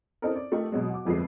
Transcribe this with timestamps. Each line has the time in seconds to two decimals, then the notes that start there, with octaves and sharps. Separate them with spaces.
0.22 C4 C#4 D#4 E4 A4 A#4
0.36 D5
0.52 A3 D#4 F4 G4 A#4
0.72 B2 F#3 G#3
0.90 F#4 D6
1.05 G1 F2 F3 G#3 B4 C7